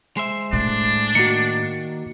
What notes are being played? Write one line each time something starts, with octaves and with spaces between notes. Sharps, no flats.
G#3 C5 E5
A2 D4
D#3 A#3 F#4 C#7